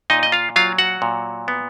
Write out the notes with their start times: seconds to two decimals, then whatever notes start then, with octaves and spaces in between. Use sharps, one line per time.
0.10 A#2 D#4 D#5
0.23 D#5
0.32 F4 F5
0.56 F#3 F4 F5
0.79 F#4 F#5
1.02 A#2
1.48 B3